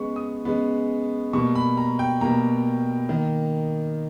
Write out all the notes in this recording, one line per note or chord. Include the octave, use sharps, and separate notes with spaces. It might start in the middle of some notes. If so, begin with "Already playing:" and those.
Already playing: C#3 G#3 B3 C#6
D#6
C#3 G#3 B3
B2 G3 A#3 C#6
B5
A#5
G5
B2 G3 A#3 A#5
D#3 A#3